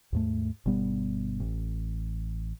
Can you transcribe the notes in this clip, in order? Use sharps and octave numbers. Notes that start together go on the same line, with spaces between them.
D#2 G#2 A3
G1 B2 G3 B3
A1